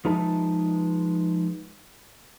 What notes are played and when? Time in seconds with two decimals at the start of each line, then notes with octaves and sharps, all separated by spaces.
0.05 F3 G#3 D#4 B4 E5 A5